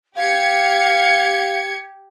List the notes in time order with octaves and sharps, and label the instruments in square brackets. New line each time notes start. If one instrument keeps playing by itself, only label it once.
[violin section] G4 G#6 C#7 [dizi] F5